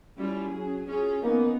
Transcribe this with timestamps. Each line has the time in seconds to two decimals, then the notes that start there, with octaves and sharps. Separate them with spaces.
0.17 G3 C#4 E4 F4
0.48 F#3 G#4
0.88 C#4 F4 G#4
1.23 A#3 B3 C#4 D#4